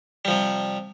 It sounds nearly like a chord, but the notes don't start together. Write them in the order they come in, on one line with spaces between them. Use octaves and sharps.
G3 F3 C3